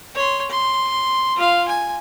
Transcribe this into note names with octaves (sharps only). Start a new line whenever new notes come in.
C#5 C6
C6
F4 F5
G#5